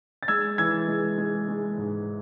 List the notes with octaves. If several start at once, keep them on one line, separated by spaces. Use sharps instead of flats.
A6
G#3 E6 G#6
E3 E6 G#6
G#3
G#3
G#3
G#2